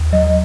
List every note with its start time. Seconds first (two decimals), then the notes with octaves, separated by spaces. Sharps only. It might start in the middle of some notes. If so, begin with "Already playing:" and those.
Already playing: D#2
0.12 F#3 D#5